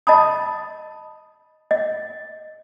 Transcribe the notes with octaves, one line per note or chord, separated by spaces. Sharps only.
D#5 A5 B5 D#6
D#5